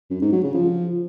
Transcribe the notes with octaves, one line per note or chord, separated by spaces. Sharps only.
F#2
G#2
F#3
C#3
F3